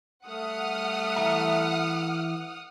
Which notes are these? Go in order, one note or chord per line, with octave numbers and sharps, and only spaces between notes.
G3 A3 F#5 D#6 F6
E3 E5 A#5